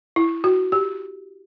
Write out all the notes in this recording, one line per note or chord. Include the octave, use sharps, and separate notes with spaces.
E4
F#4
G4